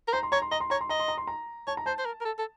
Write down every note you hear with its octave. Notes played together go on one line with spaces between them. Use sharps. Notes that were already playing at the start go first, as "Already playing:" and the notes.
A#4
C5 A#5
C6
C#5 A#5
C6
D#5 A#5
C6
C#5 A#5
C6
D#5 A#5
C6
A#5
C6
A#5
C#5 A5
A#5
C5 A5
C5
A#4
A#4
A4
A4